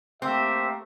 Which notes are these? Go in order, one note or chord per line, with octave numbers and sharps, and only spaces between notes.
A3 A#3 C4 G4 E5